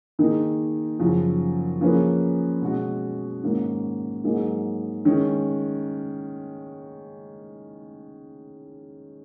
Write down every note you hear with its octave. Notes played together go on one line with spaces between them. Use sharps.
D#3 A#3 D#4 G#4
F#2 C#3 F3
F3 A#3 C#4 G#4 B4
B2 G#3 C#4 F#4
G#2 D#3 A#3 C#4
G#2 F#3 A#3 D#4 G#4
D#3 G#3 C#4